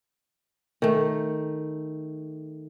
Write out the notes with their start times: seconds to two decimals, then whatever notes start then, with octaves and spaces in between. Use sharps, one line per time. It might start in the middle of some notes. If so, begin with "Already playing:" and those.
0.82 D#3 A3